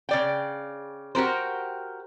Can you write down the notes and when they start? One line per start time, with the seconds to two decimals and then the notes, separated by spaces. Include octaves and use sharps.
0.09 C#3 D5 G5
1.15 F#4 G4 A#4 C5